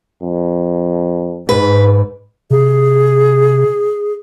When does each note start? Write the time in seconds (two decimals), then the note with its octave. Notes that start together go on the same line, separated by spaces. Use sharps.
0.23 F2
1.49 G#2 B4
2.51 C3 G#4